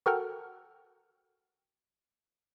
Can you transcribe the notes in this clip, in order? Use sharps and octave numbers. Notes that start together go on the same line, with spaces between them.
F#4 A4 A#4 F#5 G5 F6